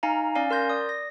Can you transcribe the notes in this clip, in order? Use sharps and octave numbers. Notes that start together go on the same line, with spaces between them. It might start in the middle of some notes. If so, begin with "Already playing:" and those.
D#4 F5 G#5 A#5
C#4 D5 F5 G#5
A#4 C6 G6 A#6
D5 D#6
A#6